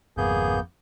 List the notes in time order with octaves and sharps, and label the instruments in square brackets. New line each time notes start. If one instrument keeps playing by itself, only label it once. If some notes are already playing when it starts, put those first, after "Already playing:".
[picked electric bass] G#1 F2 [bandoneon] A#3 B3 G6 [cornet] G#4